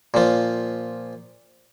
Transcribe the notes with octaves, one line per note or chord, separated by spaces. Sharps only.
A#2 F3